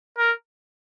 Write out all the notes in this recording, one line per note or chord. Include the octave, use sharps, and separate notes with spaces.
A#4